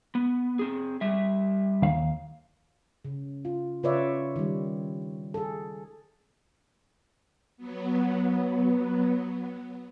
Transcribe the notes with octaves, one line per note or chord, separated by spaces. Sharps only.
B3
C4 G#4
G3 E5
D#2 F5
C#3
F4
C#3 F4 B4 C#5 D5 E5
D#3 G3
G#4 A4
F#3 B3